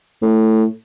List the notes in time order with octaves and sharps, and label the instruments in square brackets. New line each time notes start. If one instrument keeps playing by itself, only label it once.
[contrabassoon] A2